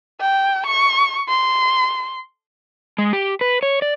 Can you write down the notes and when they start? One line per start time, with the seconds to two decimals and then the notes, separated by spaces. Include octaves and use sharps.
0.21 G5
0.66 C#6
1.29 C6
2.98 G#3
3.13 G4
3.41 B4
3.63 C#5
3.82 D5